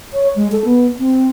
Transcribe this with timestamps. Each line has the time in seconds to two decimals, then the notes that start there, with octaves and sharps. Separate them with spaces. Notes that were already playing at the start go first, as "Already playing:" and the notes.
0.13 C#5
0.36 G#3
0.52 A4
0.65 B3
0.99 C4